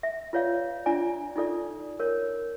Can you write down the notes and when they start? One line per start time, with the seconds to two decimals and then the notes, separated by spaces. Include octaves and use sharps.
0.03 E5
0.33 F4 B4 C#5 D5 F5
0.86 D4 F4 D5 G#5 A#5
1.36 D#4 F4 A4 D5
2.00 A#4 C#5